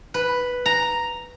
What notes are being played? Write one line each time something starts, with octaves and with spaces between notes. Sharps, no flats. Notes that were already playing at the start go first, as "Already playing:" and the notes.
B4
A#5